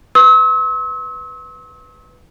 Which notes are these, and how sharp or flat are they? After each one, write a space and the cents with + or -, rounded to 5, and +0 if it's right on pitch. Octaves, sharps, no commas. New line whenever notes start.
B4 +0 C6 +45 E6 -40